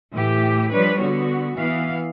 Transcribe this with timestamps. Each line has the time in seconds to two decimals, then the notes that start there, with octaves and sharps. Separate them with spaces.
0.12 A2 E3 G4
0.70 F3 G3 D4 B4 C#5
1.02 D3 B3 F#4
1.56 E3 B3 F5